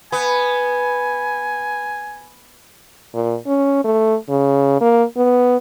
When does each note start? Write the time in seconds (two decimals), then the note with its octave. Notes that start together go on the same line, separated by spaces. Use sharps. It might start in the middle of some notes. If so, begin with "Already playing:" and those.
0.12 B3 G#5
3.15 A#2
3.47 C#4
3.84 A3
4.29 C#3
4.81 A#3
5.17 B3